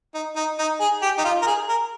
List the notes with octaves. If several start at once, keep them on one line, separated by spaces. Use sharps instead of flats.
D#4
D#4
D#4
G#4
G4
D#4
F4
A#4
G#4
A#4